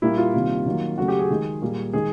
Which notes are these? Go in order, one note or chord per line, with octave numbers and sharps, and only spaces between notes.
A#2 G3 A#3 E4
F4
C3 D#3 G3 A#3
D#3 F#3 A#3
C#3 F#3 A3 F#4
G4
G#4
D#3 G#3
A#2 G3 A#3
D#3 G#3 G#4